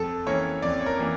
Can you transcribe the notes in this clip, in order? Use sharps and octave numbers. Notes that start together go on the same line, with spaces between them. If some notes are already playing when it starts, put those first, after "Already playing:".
Already playing: F2 A4
E3 A#3 C#4 C#5
F2 D5
C#5
A#4
E3 A#3 C#4